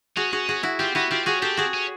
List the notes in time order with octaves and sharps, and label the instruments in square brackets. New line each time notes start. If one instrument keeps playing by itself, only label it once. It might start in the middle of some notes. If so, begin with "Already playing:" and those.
[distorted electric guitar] C#4 [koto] F#4 G#4
[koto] F#4 G#4
F#4 G#4
E4 F#4
[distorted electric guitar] C4 [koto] F4 G4
[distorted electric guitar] B3 [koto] E4 F#4
[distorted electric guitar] C4 [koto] F4 G4
[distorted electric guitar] C#4 [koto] F#4 G#4
[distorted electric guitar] C4 [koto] G4 A4
[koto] F#4 G#4
[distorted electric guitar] C#4